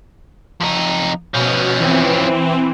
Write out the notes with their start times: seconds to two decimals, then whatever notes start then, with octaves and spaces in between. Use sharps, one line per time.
0.61 F2 D#4
1.34 B2 F3 C#4
1.80 E3 C4